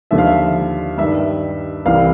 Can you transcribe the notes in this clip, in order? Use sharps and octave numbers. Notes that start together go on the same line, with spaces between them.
D#2 D3 F3 E5
F5
E5
G2 D#3 E5
C2 C3 E3 F5